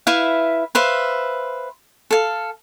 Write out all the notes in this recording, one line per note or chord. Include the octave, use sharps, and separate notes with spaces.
E4 B4 E5 F5
B4 C5 E5 F5
A4 F5